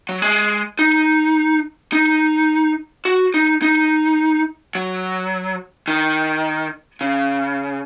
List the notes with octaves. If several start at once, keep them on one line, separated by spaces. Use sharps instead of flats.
F#3
G#3
D#4
D#4
F#4
D#4
D#4
F#3
D#3
C#3